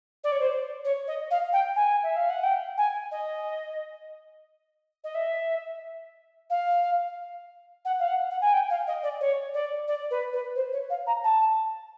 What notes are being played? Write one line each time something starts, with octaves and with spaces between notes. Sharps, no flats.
D5
C#5
C5
C#5
D#5
F5
G5
G#5
E5
F5
F#5
G5
G#5
D#5
D#5
E5
F5
F#5
F5
F#5
F#5
G#5
G5
F5
D#5
D5
C#5
D5
D5
B4
B4
C5
C#5
F5
A#5
A5